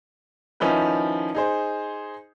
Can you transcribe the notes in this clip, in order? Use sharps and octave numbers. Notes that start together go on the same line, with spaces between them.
D#3 F3 C#4 D#4 E4 B4
D#4 G#4 C5